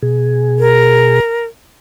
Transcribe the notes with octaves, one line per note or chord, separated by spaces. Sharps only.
B2 G#4
A#4